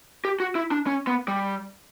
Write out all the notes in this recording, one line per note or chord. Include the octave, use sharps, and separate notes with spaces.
G4
F#4
E4
D4
C#4
B3
G3